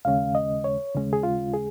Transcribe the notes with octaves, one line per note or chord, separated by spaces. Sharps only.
D#2 C#3 G#3 C#4 F5
D#5
C#5
D#2 C#3 G#3 C#4
G#4
F4
G#4